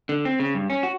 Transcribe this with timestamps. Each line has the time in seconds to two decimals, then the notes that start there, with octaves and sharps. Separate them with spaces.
0.09 D3
0.25 C4
0.40 C#3
0.55 G2
0.70 C#4
0.83 F#4